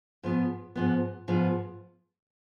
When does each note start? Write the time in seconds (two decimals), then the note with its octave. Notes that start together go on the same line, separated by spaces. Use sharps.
0.23 G#2 F3 B3
0.76 G#2 F3 B3
1.28 G#2 F3 B3